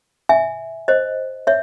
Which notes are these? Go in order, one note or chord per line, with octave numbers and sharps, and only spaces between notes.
E5 G#5
C5 D#5
C#5 E5